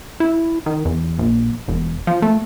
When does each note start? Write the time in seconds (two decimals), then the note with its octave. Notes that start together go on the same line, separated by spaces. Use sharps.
0.20 E4
0.66 D#3
0.85 E2
1.19 A#1
1.68 E1
2.07 F3
2.22 A3